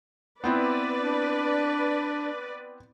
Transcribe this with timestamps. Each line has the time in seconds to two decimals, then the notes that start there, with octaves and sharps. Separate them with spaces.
0.44 B3 C4 E4 B4 D5
1.03 D4